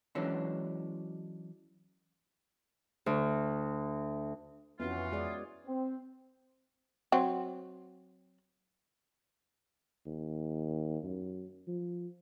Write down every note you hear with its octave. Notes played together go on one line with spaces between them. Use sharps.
E3 F#3 G#3 C#4 D4
D2
F2 E3 B3 C#4 F4 F#4
G#3 G#4 D5
C4
F#3 C4
D#2
F#2
F3